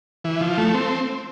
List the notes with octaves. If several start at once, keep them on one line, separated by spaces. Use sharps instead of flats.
E3
F3
A3
C4